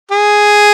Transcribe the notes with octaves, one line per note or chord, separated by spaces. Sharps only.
G#4